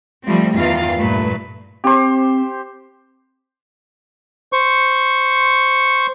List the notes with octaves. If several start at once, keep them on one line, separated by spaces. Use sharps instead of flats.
F3 G3 A3 C4
E2 G2 D#3 E3 F4 F5
G2 A#2 A3 B4
C4 G4 C5
C5 C#6